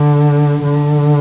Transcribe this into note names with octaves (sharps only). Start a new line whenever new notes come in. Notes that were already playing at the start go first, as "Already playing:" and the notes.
Already playing: D3
D3